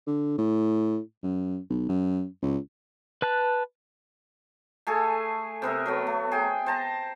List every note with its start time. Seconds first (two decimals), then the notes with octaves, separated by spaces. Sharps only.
0.07 D3
0.38 A2
1.23 F#2
1.70 B1
1.89 F#2
2.42 C#2
3.22 B4 A5 F#6
4.87 A3 G#4 A4 G#5
5.62 C3 B3 A#4 E5
5.86 F#3 A3 B3
6.07 A3
6.32 G#4 G5
6.66 C5 A5 A#5